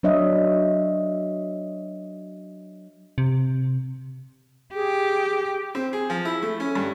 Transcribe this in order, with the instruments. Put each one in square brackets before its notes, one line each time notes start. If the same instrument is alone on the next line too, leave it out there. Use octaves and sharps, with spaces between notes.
[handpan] F#3 D4 C#5 D#5 E5
[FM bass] C3
[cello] G4 [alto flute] G#4
[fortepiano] C4
G#4
F3
E4
A3
C#4
G2